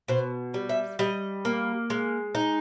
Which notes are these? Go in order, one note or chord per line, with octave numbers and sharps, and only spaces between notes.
B2 C5
G3
E5
G3 D#5
A#3
G#3
D#4